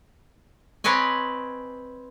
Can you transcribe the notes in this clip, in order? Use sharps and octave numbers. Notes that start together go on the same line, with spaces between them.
C4 B4 C#5 D#5 G#5